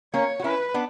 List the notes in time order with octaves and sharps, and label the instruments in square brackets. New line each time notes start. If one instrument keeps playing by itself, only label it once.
[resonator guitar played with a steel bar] A#3 C#4 [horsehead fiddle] C#5
[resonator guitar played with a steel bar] F#4
[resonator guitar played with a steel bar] C#4 E4 [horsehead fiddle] B4
[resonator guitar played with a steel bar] B3 D4